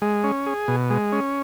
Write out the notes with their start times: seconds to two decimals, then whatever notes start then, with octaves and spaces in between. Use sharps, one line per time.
0.02 G#3
0.24 C#4
0.46 G#4
0.68 B2
0.90 G#3
1.12 C#4